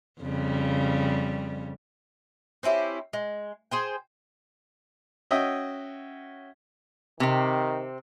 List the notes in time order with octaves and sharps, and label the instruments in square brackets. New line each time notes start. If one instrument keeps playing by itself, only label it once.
[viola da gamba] F2 C#3 G3
[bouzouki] C4 C#4 E4 G4
G#3
G#4 C5 G5
[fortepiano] C#4 F#4 D#5 E5 G5
[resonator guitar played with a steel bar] C3 C4 [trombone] D#3